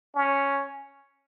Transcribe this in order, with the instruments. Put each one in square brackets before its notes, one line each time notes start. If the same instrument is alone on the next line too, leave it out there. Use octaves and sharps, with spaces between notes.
[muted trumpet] C#4